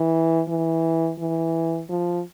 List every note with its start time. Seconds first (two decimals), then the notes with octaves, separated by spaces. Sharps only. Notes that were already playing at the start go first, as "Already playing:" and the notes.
Already playing: E3
0.48 E3
1.19 E3
1.89 F3